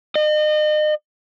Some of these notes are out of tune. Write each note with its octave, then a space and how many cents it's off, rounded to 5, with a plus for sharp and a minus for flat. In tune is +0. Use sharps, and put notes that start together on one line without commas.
D#5 -35